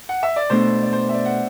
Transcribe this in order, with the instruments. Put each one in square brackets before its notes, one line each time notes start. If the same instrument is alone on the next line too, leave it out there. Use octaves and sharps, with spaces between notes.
[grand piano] F#5
E5
D5
[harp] B2 A3 D4 A4 [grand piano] C5
[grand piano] D5
C5
E5
D5
F#5